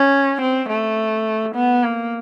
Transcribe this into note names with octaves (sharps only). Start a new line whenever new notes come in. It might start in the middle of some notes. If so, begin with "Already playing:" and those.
Already playing: C#4
C4
A3
B3
A#3